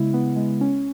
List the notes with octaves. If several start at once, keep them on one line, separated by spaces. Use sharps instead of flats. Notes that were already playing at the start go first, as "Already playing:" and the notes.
Already playing: C#3 G#3 B3 E4
B3
G#3
C#4